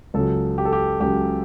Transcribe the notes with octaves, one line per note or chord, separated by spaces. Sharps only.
C#2 C#3 F#3 A4
G4
A4
G4
C#2 C#3 F#3 G4